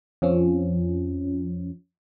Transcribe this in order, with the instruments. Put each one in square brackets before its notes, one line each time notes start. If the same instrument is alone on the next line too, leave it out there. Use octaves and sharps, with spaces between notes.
[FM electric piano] F2 F3 C#4